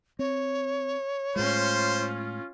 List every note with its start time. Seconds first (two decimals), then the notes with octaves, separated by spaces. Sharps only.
0.19 C4 C#5
1.36 A2 G#3 C#4 F4 C5 C6